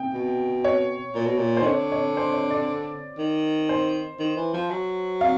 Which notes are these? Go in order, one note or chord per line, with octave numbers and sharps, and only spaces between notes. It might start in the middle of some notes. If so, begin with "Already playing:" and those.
Already playing: G5
B2
C#5
A#2
B2
A#2
C5
D#3
D3 C#5
C#5
C5
C#5
D5
D#3
C5
D#3
E3
F3
F#3
F5